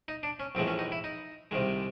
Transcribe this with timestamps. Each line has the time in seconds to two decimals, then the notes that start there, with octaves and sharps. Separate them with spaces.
0.08 D#4
0.23 D4
0.40 C#4
0.55 A#1 A2 E3 G#3 C4
0.67 C#4
0.79 D#4
0.92 E4
1.04 D#4
1.51 C2 C3 D#3 G#3